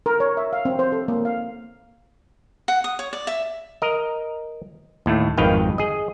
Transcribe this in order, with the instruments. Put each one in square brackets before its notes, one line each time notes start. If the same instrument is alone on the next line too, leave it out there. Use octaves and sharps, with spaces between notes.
[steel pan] A#4
C#5
E5
F5
C4
C5
A4
A#3
F5
[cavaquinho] F#5
D#6
C#5
D5
E5
[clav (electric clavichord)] A#4 D#5
D#2 A2 A3
G#1 F2 D#3 B4 F5 G5
G#4 D#5